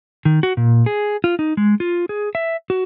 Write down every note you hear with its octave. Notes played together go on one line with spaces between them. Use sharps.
D#3
F#4
A#2
G#4
F4
D#4
G#3
F4
G#4
E5
F#4